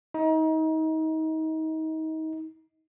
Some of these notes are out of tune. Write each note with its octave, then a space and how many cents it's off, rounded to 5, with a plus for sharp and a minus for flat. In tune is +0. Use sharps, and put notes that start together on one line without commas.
D#4 +30